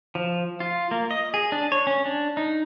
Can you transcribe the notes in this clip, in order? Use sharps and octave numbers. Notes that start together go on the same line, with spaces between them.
F3
F4
A#3
D#5
G#4
D4
C#5
C#4
D4
D#4